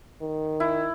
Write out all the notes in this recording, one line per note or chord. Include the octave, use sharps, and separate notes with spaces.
D#3
E4